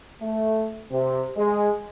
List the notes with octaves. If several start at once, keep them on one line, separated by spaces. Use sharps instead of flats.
A3
C3
G#3